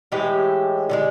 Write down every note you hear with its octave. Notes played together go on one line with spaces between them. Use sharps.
A2 E3 G#3 G4
D3 F3 G#3